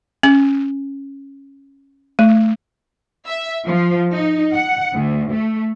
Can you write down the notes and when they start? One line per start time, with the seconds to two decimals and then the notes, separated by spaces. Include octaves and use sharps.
0.23 C#4
2.19 A3
3.27 E5
3.65 F3
4.13 D#4
4.53 F#5
4.94 D2
5.33 A3